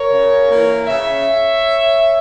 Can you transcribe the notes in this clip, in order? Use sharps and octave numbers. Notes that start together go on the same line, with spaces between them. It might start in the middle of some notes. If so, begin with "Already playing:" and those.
Already playing: A#4 C#5
C#3
E3 A#3
C#3 C#5 E5